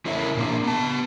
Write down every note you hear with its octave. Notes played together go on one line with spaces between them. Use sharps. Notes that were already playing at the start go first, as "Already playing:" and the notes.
C#4 E4 A#4 C#5 E5
A#2 A#3 D4
B3 A5